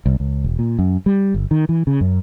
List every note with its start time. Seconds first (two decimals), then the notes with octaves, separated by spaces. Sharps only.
0.06 C2
0.20 C#2
0.44 E1
0.59 A#2
0.79 F#2
1.06 G3
1.34 G1
1.51 D#3
1.69 E3
1.87 C#3
2.01 F#2